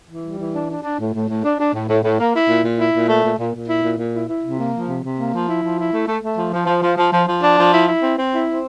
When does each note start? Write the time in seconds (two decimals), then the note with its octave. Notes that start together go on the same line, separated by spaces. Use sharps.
0.09 E3
0.23 G3
0.39 E3
0.54 D4
0.68 D4
0.83 D4
0.99 A2
1.13 A2
1.28 A2
1.43 D4
1.58 D4
1.73 A2
1.88 A2
2.03 A2
2.18 A#3
2.33 E4
2.48 A#2
2.63 A#2
2.78 E4
2.93 A#2
3.08 A3
3.23 A#2
3.38 A#2
3.53 A#2
3.68 E4
3.82 A#2
3.97 A#2
4.13 E4
4.28 E4
4.43 C3
4.58 A#3
4.73 F3
4.88 C3
5.03 C3
5.17 A#3
5.33 F3
5.48 E4
5.62 F3
5.78 E4
5.92 A3
6.07 A3
6.22 A3
6.37 F3
6.52 F3
6.67 F3
6.82 F3
6.97 F3
7.12 F3
7.27 F3
7.42 D4
7.57 F3
7.73 E4
7.87 E4
8.02 C4
8.17 C4
8.32 E4
8.47 C4